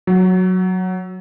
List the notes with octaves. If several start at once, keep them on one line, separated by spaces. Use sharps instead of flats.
F#3